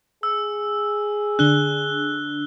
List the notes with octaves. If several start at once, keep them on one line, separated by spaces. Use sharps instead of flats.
G#4 E6
D3 D4 F#6 G7